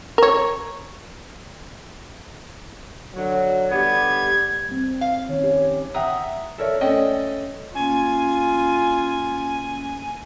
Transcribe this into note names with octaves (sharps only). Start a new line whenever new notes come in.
A#4 C#5
D3 F#3
D3 G3 B3 G#6
G3 C4
F5
D#3 C#4 C#5
G4
E5 F#5 G5 A#5 D#6
A4 A#4 C#5 D5 E5
A3 C#4 D5 D#5 G5
A#3 C#4 F4 G#5